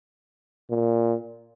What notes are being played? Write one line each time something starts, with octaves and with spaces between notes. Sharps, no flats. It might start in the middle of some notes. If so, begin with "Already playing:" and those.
A#2